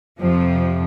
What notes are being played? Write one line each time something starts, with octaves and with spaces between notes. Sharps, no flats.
F2 C3 F3